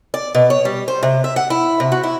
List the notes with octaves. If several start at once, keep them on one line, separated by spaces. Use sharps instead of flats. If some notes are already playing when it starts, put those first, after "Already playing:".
D5
B2
C#5
G3
C5
C3
E5
F#5
E4
C3
F#4
E4